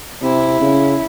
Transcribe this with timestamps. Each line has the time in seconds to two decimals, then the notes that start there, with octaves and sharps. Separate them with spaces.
0.22 C3 E4
0.61 C#3